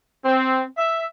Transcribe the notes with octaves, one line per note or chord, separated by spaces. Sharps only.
C4
E5